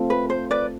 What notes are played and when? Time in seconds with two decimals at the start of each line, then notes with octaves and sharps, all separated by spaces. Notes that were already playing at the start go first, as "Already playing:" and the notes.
Already playing: A3 C4 F4 A4
0.10 B4
0.30 C5
0.51 B4 D5